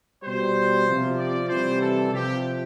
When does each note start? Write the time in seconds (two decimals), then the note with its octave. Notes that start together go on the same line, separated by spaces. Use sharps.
0.23 B2 G3 C5
0.86 C3 F3
1.18 D5
1.49 C3 E3 G3 C5
1.81 A4
2.12 C3 F3 G4